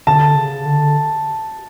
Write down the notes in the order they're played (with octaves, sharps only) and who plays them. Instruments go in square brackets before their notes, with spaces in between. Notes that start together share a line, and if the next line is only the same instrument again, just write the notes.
[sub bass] D3 [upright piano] A5
[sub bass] C#3
D3